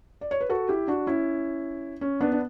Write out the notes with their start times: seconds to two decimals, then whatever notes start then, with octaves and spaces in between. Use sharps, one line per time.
0.21 D5
0.31 C#5
0.41 B4
0.50 F#4 A4
0.69 E4 G4
0.88 D4 F#4
1.07 C#4 E4
2.01 C#4
2.21 B3 D4
2.32 D4